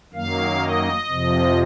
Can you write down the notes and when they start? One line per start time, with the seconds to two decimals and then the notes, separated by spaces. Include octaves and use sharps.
0.13 F#2 D#3 F#3 A#3 F5
0.61 D#5
1.08 F2 C3 F3